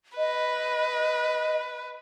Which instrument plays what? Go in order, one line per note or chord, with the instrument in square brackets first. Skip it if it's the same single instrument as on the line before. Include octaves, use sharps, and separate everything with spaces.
[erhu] B4 [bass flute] D#5